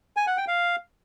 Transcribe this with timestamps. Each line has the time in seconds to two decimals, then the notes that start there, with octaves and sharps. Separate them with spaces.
0.17 G#5
0.27 F#5
0.37 G5
0.48 F5